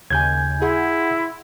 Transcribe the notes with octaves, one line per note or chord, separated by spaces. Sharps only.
D#2 C#3 G#5 G6 G#6
E4 G#4 F#5 C6